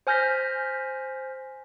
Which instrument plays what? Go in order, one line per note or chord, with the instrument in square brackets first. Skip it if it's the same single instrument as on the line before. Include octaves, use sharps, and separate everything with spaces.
[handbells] C5 G#5 F6 G6 A#6 B6